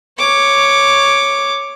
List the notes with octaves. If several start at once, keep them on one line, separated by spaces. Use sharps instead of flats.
C#5 D6